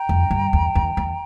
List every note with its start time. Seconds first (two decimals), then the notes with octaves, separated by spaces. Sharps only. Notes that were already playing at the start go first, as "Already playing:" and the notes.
Already playing: G5 A#5
0.09 F2
0.31 G2
0.53 E2
0.75 E2
0.97 E2